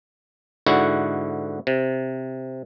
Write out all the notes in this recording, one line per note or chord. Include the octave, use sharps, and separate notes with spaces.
G#2 D3 E4 F#4 F#5
C3